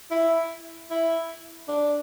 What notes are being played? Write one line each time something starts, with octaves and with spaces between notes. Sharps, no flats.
E4
E4
D4